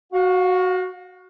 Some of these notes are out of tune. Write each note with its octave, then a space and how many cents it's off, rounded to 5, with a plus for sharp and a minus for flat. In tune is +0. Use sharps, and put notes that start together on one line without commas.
F#4 +0 F5 +35